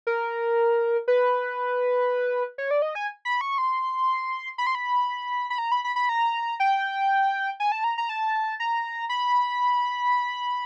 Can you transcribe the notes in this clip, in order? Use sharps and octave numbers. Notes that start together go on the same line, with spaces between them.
A#4
B4
C#5
D5
D#5
G#5
B5
C#6
C6
B5
C6
B5
B5
A#5
B5
B5
B5
A#5
G5
G#5
A5
A#5
A#5
A5
A#5
B5